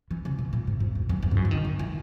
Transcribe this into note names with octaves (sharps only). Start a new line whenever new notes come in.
E3
C#3
B2
A#2
G#2
G#2
E2
F#2
E2
G#2
F#2
E3
D#3
E3
E3